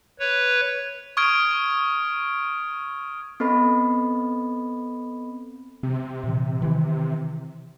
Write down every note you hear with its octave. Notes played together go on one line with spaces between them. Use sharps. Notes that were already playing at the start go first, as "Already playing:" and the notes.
B4 C#5
C#6 D#6 F6 G#6 D7
B3 C4 A4 D#5 B5
C3 C4
A#2 E3
D#3 E3